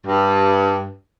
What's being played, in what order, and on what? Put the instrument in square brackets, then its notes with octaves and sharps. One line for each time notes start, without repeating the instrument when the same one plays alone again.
[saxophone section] G2